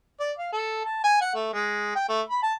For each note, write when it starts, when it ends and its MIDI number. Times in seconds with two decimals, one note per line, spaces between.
0.20 0.32 74
0.38 0.51 77
0.52 0.84 69
0.85 1.01 81
1.04 1.18 80
1.21 1.34 78
1.34 1.53 57
1.53 1.94 56
1.95 2.04 79
2.08 2.21 57
2.30 2.42 83
2.43 2.54 81